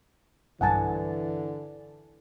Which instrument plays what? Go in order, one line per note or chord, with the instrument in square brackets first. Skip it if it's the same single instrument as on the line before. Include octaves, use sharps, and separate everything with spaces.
[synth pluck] B1 G2 [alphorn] D3 [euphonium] E3 [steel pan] F#5 G#5 A5